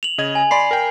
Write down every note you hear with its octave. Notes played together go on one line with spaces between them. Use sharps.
F7 F#7
C#3 D#5 G#6
G#5
D5 B5 C6 C7
A#4 G5